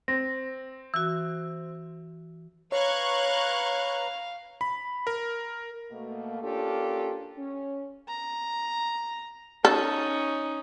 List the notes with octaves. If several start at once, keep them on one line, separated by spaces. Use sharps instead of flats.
C4 A#6
E3 F#4 E6
B4 C#5 F5 A#5 C#6 F#6 G#6
B5
A#4
B2 A3 A#3
A#3 C#4 D4 F4 G4 A4
C#4
A#5
C#4 D#4 A4